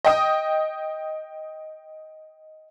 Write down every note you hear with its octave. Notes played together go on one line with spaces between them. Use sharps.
D#5 G5 D#6